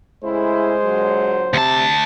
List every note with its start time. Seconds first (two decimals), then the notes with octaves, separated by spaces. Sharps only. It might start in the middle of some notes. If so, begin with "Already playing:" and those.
0.24 A2 C#3 G#3 E4 C5
0.84 A#2 D3 F#3
1.54 D2 C3 A5